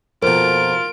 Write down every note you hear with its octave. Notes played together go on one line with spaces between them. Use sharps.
F2 B2 F4 A#4 D7